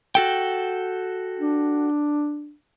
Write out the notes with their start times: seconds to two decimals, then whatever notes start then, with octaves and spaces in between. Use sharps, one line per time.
0.15 F#4 A4 G5
1.40 D4